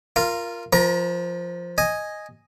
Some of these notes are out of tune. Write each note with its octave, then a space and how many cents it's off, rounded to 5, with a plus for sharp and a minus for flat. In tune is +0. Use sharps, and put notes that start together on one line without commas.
F4 +0 A#4 +0 F5 -20
F3 +0 A#4 +40 A#5 +0
D#5 +0 G#5 +0